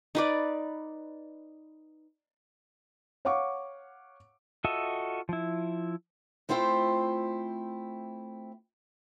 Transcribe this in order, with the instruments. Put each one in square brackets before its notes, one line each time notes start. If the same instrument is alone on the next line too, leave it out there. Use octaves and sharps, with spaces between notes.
[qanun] D#4 B4 D5
[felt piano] C#5 F5 F#5 C#6 D6
[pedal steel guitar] F4 F#4 A4 D#5 E5
F3 E4
[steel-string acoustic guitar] A3 C4 E4 F4 C5 G5